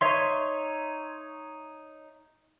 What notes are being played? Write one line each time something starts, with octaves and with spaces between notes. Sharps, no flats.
D#4 C#5 E5 C6